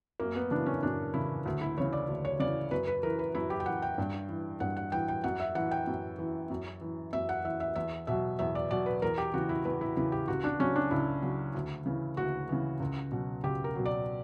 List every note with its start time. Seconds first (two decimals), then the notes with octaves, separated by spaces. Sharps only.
0.20 F#2 A#3
0.35 B3
0.51 C#3 E3 D4
0.66 C#4
0.83 F#2 D4
1.14 C#3 E3 E4
1.46 D2
1.61 E4
1.77 C#3 E3 C#5
1.93 D5
2.08 D2
2.25 C#5
2.39 C#3 E3 D5
2.71 F#2 B4
2.87 B4
3.03 E3 A#4
3.19 B4
3.35 F#2 E4
3.50 G4
3.60 G5
3.66 E3 F#5
3.82 G5
3.98 G2
4.29 E3
4.60 G2 F#5
4.77 F#5
4.92 E3 G5
5.08 G5
5.24 F#2 F#5
5.40 E5
5.55 E3 F#5
5.71 G5
5.87 F#2
6.19 E3
6.50 F#2
6.81 E3
7.13 F#2 E5
7.29 F#5
7.45 E3 E5
7.60 E5
7.76 E2 E5
8.07 B2 F#3 E5
8.39 E2 E5
8.55 D5
8.71 B2 F#3 D5
8.86 B4
9.02 E2 A#4
9.18 G4
9.34 C#3 E3 F#4
9.49 E4
9.65 E2 B4
9.81 E4
9.97 C#3 E3 E4
10.12 G4
10.28 C#2 F#4
10.44 D4
10.60 C#3 F#3 C#4
10.76 D4
10.91 C#2 E4
11.22 C#3 F#3
11.55 D2
11.86 C#3 E3
12.17 D2 F#4
12.49 C#3 E3
12.80 C#2
13.12 B2 F#3
13.43 C#2 G4
13.64 A#4
13.75 B2 F#3
13.86 D5